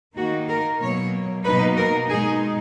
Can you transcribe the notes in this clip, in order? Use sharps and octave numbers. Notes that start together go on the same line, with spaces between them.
D#3 A#3 D#4 F#4
A#4
B2 F#3 A#3 C#5
B2 F#3 A#3 D#4 B4
A#4
B2 G#3 D#4 G#4